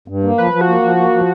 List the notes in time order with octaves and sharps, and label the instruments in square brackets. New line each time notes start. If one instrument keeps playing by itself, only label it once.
[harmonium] G2
A#3
[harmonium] F3 [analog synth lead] B4
[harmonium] F3
[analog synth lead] F#4
[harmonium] A#3
F3
A#3
F3